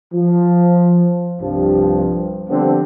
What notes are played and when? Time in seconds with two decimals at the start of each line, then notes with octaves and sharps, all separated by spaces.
0.13 F3
1.40 C2 G2 F3
2.49 D3 F3 G3 B3 C4 D4